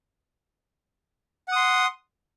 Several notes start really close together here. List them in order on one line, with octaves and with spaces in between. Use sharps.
F#5 D#6 C6